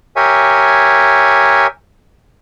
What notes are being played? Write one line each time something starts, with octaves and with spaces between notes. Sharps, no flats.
G4 A#4 C#5 E5 G#5